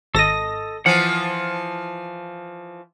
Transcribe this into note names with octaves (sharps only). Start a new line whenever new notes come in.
G#1 A4 D#5 A#6
E3 F3 F#5